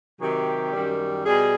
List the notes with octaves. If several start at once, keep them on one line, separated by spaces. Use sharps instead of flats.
C3 D#3 F#3 G4
F#2 D#3 G3
B2 G3 G#4